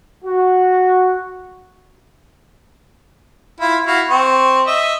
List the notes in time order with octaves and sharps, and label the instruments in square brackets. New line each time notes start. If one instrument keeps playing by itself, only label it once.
[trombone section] F#4
[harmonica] E4 F4
E4 F#4 F5
C4 C#6
D#5 E5